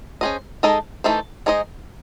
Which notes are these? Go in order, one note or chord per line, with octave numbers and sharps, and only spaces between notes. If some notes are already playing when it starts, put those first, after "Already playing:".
C#4 G#4 C5 D#5
G#3 D#4 A4 D#5
E3 A3 D#4 A4 C5
G#3 D#4 G#4 C5 D#5